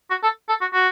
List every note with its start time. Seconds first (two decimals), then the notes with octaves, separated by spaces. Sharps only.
0.10 F#4
0.23 A4
0.49 A4
0.61 F#4
0.73 F#4